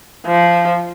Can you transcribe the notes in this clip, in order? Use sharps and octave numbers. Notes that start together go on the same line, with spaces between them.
F3